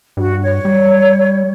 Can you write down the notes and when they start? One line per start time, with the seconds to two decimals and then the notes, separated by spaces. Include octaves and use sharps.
0.17 G2 F#4
0.42 C#5
0.65 G3